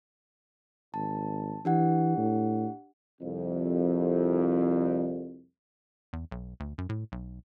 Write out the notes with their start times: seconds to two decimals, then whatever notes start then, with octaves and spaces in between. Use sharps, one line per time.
0.94 G#1 A5
1.65 E3 D4 G4 F#5
2.17 A2
3.21 C2 F2
6.13 E2
6.32 B1
6.60 D2
6.78 F#2
6.89 A2
7.12 B1